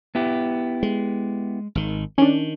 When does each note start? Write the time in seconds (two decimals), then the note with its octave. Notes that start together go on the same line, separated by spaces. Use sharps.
0.15 B3 E4 G4
0.83 G#3
1.75 G#1 D#3
2.18 D#3 C#4 D4